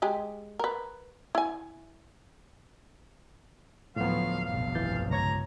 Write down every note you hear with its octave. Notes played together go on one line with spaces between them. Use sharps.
G#3 G4 G#4
A#4 B4
E4 G#5
D2 A2 F3 F#3 B3 F5
F1 B1 G2 F5
E3 G6 A6
C#2 C#5 A#5 G#6